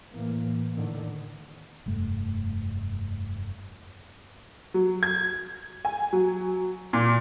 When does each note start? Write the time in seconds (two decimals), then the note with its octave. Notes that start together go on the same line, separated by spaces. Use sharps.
0.13 A2 E3 A#3
0.73 A2 D3 D#3
1.86 F1 G2 A3
4.74 F#3
5.03 G#6
5.85 G#5
6.13 F#3
6.93 A#2